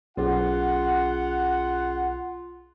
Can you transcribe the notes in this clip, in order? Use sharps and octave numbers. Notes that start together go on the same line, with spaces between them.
B1 C#4 F4 G#4 F#5